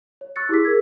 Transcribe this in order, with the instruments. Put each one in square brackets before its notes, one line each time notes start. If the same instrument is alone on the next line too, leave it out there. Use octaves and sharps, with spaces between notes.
[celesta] C#5
C#6 E6 F#6 A6 C#7
E4 G4 G#4 D6 E6 B6
G#4 A#4 E6 G#6